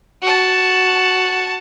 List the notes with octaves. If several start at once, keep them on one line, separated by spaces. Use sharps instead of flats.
F#4 A5